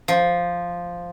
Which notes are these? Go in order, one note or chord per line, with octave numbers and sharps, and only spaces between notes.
F3